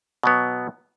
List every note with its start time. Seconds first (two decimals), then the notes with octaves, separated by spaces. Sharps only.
0.23 B2 F#3 B3